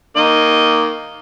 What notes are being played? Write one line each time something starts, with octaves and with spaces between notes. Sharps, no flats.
D#3 A#3 D#5